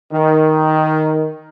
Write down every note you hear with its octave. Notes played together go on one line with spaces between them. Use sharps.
D#3